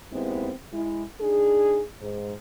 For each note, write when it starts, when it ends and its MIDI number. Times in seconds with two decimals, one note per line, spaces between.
0.12 0.51 39
0.12 0.51 56
0.12 0.51 59
0.12 0.51 60
0.12 0.51 64
0.72 1.03 56
0.72 1.03 64
1.21 1.83 62
1.21 1.83 63
1.21 1.83 68
2.01 2.33 44